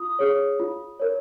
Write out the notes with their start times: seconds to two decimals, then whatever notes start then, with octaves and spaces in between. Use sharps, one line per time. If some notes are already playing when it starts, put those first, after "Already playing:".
Already playing: F4 D#6
0.19 G#4 C#5
0.60 F4
1.00 A#4 C#5